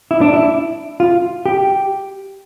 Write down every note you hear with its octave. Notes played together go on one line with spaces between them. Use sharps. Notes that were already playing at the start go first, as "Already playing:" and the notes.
E4
D4
E4
F4
G4